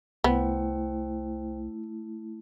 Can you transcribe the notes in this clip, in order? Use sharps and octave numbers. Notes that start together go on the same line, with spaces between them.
C2 A3 B3 E4 C5 G5